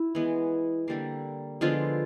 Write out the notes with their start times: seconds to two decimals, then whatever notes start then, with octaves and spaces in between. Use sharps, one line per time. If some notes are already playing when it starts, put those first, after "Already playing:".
Already playing: E4
0.15 E3 G#3 B3
0.88 D3 G3 A#3
1.61 D3 F3 G#3 B3 F4